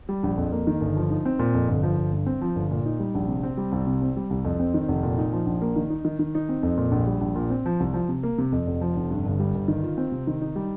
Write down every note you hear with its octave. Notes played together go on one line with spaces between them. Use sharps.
G3
A#1
F2
A#3
D#3
G1
F3
D#4
C4
A#2
F2
G1
F3
G1
G2
C4
F3
G1
A#2
D#4
G3
A#1
C3
C4
G3
C2
C3
C4
G3
C2
F2
C4
D#3
F1
A#2
D#4
F3
A#1
A#3
D#3
D#4
D#3
D#3
D#4
C4
F2
A#2
A#1
G3
A#1
A#2
C4
F3
C2
F3
C3
A#3
C3
F2
F1
F3
F1
G2
G1
G3
G1
D#3
F4
C4
C3
D#3
D#4
G3